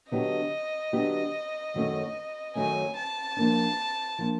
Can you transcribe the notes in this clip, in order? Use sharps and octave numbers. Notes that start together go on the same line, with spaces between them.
D3 F#3 B3 D4 G4 D#5
D3 F#3 B3 D4 G4
F#2 D#3 F#3 A3 C#4
F#2 D#3 F#3 A3 C#4 G#5
A5
F3 A#3 D4
F3 A#3 D4